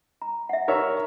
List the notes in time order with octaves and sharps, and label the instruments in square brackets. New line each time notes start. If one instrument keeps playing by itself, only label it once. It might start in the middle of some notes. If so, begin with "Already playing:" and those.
[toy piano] A#5
E5 F#5
[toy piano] D#4 G4 [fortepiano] A#4 C#5 E5